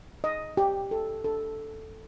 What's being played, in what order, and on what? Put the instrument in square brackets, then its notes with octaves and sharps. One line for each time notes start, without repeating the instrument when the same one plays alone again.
[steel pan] D#5
G4
A4
A4